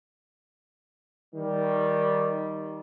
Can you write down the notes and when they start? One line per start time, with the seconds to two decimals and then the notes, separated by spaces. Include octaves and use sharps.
1.34 D#3 G3